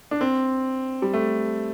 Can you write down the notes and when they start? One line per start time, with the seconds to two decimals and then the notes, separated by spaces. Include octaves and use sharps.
0.11 D4
0.21 C4
1.02 G3
1.14 A3